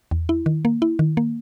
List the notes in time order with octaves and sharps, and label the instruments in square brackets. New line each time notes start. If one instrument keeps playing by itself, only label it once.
[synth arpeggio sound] E2
E4
D#3
A#3
E4
D#3
A#3